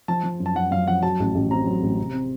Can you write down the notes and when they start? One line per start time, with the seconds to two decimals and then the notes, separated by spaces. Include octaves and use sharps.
0.08 F3 A5
0.23 F3
0.40 F#2
0.46 A5
0.55 F#2 F#5
0.71 F#2 F5
0.88 F3 F#5
1.03 F#3 A5
1.20 A1
1.35 A1
1.51 C4 A#5
1.67 F#3
1.82 A1
1.98 C3
2.13 C4